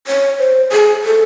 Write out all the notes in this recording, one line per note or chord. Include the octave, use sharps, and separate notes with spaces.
C#5
C5
G#4
A4